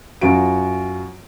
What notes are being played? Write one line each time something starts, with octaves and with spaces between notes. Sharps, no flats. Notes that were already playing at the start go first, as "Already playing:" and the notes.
F#2 F4 F#4 D7